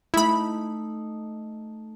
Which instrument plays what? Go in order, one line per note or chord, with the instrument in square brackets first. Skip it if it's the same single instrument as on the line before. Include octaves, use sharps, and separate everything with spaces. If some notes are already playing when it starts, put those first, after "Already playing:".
[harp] A3 D#4 [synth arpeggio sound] E4 B5